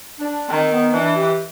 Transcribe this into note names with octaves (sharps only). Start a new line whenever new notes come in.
D4
D#3 C4
A#3
B3
E3 D4
G4